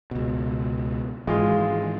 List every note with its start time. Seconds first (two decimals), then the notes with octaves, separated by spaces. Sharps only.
0.11 C#2 B2
1.27 G#1 E3 G#3 F4